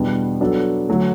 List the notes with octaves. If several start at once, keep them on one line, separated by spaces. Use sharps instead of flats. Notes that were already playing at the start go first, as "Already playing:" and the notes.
Already playing: E2 B2 G3 B3 D4
F#3 B3 D4 F#4 A4
D3 F#3 A3